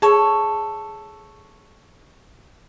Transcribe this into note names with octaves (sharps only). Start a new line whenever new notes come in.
G#4 A4 C#5